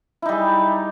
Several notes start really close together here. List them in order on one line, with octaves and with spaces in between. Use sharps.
E4 D#4 G3 G#4